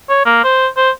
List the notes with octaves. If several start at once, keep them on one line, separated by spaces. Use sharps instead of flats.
C#5
A#3
C5
C5